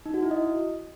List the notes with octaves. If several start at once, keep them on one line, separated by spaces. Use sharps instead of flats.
D#4
F#4
E4
D#5